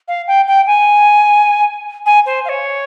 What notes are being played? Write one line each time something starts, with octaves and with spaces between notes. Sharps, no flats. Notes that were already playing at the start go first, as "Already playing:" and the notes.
F5
G5
G5
G#5
G#5
C5
F5
C#5